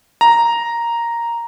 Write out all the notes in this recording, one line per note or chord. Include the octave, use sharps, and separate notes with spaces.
A#5